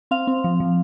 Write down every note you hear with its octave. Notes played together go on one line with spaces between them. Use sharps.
C4 F5
C4
F3
F3